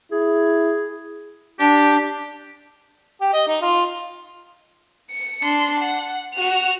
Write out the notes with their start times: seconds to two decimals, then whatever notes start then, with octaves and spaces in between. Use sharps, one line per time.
0.12 E4 G#4
1.59 D4 G4
3.21 G4
3.33 D#5
3.47 D#4
3.62 F4
5.11 C#7
5.43 D4 C6
5.79 F#5
6.34 F#4 F7